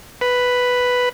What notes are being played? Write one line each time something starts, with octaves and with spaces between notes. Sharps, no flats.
B4